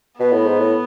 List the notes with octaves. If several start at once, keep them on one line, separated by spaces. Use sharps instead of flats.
B2 B3
A2
G#2
A2